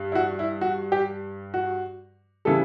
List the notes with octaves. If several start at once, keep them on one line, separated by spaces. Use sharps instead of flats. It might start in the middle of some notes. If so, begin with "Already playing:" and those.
Already playing: G2
E4
F#4
E4
F#4
G4
F#4
C#3 E3 G3 A4